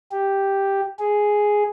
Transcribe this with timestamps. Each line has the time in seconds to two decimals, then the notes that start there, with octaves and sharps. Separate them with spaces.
0.12 G4
0.99 G#4